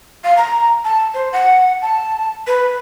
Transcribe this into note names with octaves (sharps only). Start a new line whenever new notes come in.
F5
A#5
A5
C5
F#5
A5
B4